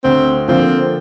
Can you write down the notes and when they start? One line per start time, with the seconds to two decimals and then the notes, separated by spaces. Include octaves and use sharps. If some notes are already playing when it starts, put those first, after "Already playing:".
0.04 D2 C4
0.48 D3 F3 A#3 C4 F4